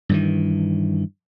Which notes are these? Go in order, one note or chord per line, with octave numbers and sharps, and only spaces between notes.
G2 D#3 E3